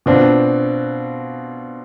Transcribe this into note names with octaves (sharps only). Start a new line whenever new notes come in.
B2 B3 C4 D4 F4